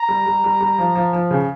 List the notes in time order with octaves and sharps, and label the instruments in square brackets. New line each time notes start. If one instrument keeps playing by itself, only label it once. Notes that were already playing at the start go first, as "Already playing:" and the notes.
Already playing: [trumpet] A#5
[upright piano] G3
G3
G3
G3
F3
F3
F3
C#3